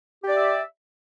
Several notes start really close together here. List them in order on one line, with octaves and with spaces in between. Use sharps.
G4 D5 E5